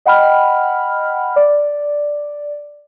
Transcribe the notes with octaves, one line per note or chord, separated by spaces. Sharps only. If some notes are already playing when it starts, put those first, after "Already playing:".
D#5 F#5 G5 B5 F6
D5